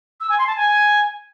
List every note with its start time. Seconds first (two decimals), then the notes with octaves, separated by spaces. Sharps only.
0.21 E6
0.29 G#5
0.38 C6
0.47 A5
0.56 G#5